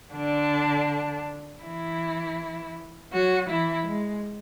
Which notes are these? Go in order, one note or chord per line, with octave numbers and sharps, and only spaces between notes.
D3 D4
E3 E4
F#3 F#4
E3 E4
G#3